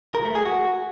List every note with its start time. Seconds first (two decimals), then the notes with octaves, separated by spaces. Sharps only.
0.15 A#4
0.25 A3
0.35 G#4
0.46 F#4